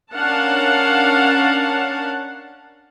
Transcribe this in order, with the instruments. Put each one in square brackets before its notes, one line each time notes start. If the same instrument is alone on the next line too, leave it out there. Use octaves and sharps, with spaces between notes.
[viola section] C#4 D4 A#4 F5 F#5 A5